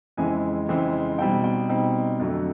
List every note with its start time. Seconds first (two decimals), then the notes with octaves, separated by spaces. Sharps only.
0.17 F2 C#3 E3 G#3 C4 G#5
0.68 F2 C#3 E3 G#3 C4
1.18 B2 G3 C4 D#4 G5
1.44 G5
1.69 B2 G3 C4 D#4
2.20 F2 D3 F#3 A3